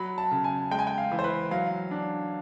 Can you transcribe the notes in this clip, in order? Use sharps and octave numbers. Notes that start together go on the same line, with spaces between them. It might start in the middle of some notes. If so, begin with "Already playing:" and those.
Already playing: F#3 B5
A5
C#3
G#5
G#3 G5
G#5
G5
F5
E3
C5
B4
F#3 F5
D4